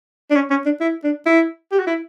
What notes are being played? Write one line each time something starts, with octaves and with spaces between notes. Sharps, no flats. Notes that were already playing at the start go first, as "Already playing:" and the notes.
D4
C#4
C#4
D4
E4
D4
E4
G4
F#4
E4